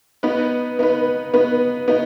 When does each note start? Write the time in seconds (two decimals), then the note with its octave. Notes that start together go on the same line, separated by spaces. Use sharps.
0.23 B3 D#4 B4
0.79 B3 D#4 B4
1.34 B3 D#4 B4
1.88 B3 D#4